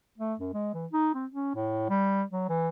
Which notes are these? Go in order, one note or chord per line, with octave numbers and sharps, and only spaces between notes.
A3
F#2
G#3
E3
D#4
C4
C#4
A2
G3
F#3
E3